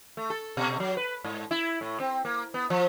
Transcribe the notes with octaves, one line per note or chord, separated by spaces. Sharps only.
A3
A4
B2
F#3
B4
G#2
E4
A2
C4
A#3
B3
F3